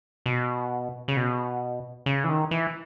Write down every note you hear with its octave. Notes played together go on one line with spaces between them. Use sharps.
B2
C#3
B2
C#3
E3
D#3
E3